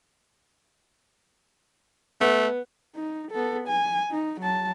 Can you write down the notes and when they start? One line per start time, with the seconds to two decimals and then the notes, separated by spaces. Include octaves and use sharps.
2.21 A3 B3
2.95 D#4
3.31 B3 A4
3.68 G#5
4.11 D#4
4.41 F#3 A5